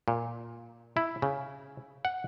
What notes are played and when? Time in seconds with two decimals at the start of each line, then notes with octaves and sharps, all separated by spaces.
0.08 A#2
0.97 E4
1.22 C#3
2.05 F#5